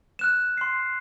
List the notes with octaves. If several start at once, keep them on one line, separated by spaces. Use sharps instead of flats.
F6 F#6 E7
C6 C7